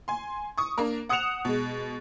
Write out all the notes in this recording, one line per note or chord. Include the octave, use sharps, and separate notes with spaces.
G#5 C6
C#6 D#6
A#3 D4 A#4
F#5 D#6 F#6 C#7 E7 F7
B2 G#3